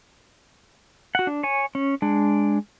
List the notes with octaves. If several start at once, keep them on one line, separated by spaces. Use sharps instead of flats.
F#4 F#5
D4
C#5 G#5
C#4
G#3 D4